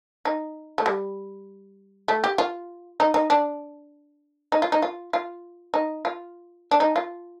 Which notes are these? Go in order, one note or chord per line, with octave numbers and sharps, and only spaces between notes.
D#4
A3
G3
A3
G4
F4
D#4
D#4
D4
D#4
F4
D#4
F4
F4
D#4
F4
D4
D#4
F4